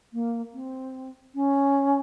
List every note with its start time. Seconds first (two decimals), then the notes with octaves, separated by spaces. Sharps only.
0.13 A#3
0.54 C4
1.35 C#4